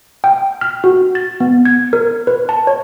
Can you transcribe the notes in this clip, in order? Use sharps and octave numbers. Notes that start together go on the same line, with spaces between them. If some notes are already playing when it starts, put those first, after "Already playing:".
G5
F6
F#4
A6
B3
G#6
A#4
B4
A5
C#5